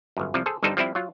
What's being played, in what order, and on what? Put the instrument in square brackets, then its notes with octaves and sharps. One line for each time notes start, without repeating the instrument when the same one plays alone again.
[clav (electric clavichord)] G1 F#2
C2 C3 F3
G#4 A4 C5
G1 G2 G3 D#4 A4 C5
F3 G3 C4 E4
F#3 F4